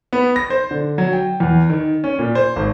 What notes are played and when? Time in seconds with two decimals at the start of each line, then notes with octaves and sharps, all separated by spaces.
0.13 B3
0.36 A#6
0.50 C5
0.71 D3
0.98 F#3
1.13 G5
1.40 E2
1.70 D#3
2.04 C#4
2.19 A#2
2.35 C5
2.56 G#1